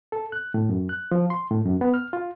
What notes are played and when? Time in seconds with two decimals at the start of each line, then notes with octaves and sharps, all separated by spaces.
0.12 A4
0.32 F#6
0.54 A2
0.69 F#2
0.89 F#6
1.11 F3
1.30 C6
1.51 A2
1.65 F#2
1.81 B3
1.94 F6
2.13 F4